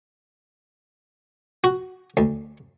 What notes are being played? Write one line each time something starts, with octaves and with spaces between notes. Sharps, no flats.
F#4
D2